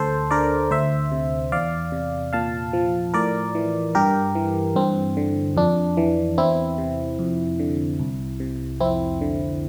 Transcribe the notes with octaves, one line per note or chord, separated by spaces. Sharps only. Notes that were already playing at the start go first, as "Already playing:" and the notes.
Already playing: D2 A4 C5
D3 A#4 D5
D2 C5 E5
C3
E2 D5 F5
C3
A#2 F5 A5
F3
A2 A#4 D5
E3
G2 G4 A#4
E3
G2 C4
D3
F2 D4
E3
E2 C4 E4
C3
F2
D3
C2
C3
F2 C4 E4
D3